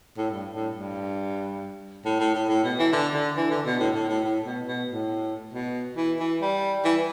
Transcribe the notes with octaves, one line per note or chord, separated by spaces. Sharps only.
A2
G2
A2
G2
A2
A2
A2
A2
B2
E3
D3
D3
E3
D3
B2
A2
A2
A2
A2
B2
B2
A2
B2
E3
E3
G3
E3